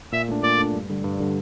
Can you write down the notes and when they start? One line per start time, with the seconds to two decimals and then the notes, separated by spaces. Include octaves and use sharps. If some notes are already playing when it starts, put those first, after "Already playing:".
0.12 A#2 E5
0.28 A3 D4
0.43 A#2 D5
0.58 A3 D4
0.73 G2
0.89 D3 G3
1.04 G2
1.20 D3 G3